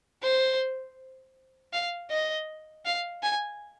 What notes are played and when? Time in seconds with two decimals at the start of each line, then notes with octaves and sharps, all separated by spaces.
0.22 C5
1.73 F5
2.10 D#5
2.85 F5
3.23 G#5